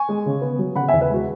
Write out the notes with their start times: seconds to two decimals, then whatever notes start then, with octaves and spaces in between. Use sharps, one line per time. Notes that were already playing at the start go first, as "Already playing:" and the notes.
Already playing: G#5 C#6
0.08 G#3
0.26 C#3
0.41 B3
0.58 F#3
0.75 C#3 F#5 B5
0.88 E5 G#5
0.93 E2
1.01 B4 E5
1.10 G#3 F#4